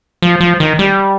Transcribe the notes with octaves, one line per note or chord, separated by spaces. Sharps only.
F3
F3
D#3
G3